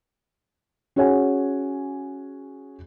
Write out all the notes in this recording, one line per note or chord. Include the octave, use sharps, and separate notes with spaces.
C#4 F#4 G#4 C#5 F#5 G#5